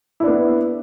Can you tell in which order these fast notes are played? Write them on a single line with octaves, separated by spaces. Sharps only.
E4 D4 B3